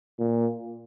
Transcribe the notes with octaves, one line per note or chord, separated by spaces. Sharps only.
A#2